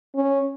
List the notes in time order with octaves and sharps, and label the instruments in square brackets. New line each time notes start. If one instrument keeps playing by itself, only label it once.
[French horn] C#4